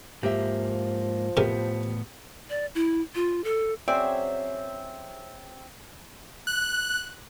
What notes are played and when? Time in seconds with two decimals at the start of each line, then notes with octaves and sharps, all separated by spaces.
0.23 G#2 F3 A#3 G4 E5
1.37 A2 C3 B3 G4 A#4
2.50 D5
2.75 E4
3.15 F4
3.44 A4
3.88 F#3 C4 C#4 G#4 C5 D5 E5
6.47 F#6